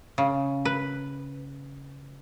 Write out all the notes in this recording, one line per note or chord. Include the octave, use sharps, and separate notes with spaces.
C#3
B4